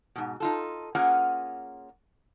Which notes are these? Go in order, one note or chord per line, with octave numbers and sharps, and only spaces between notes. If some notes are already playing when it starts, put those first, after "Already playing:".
G#2 B2
D#4 F4 A4
A#3 C#4 F4 G#4 F#5